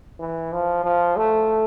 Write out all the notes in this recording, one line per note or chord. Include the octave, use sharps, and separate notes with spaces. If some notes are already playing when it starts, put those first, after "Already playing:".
E3
F3
F3
A3